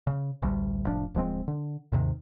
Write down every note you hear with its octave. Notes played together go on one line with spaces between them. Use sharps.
C#3
A1 D2 G3
F1 A2 F3 D4
D1 F3 G#3 C4
D3
D#2 G#2 C3 D#3